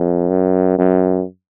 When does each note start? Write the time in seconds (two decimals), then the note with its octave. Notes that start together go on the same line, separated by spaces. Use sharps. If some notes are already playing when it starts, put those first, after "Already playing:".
Already playing: F2
0.29 F#2
0.78 F#2